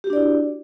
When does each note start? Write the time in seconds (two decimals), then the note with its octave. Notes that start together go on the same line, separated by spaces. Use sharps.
0.04 G4
0.07 F#4
0.10 D4
0.13 D5
0.16 E4